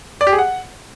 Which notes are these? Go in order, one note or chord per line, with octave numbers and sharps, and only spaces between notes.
D5
G4
G#4
F#5